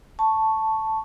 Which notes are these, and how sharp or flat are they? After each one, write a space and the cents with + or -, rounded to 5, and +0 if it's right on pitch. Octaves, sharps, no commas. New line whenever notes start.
A5 +0 C#6 +0